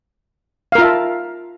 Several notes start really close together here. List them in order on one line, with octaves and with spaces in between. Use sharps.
F5 A#4 F4 E5 A5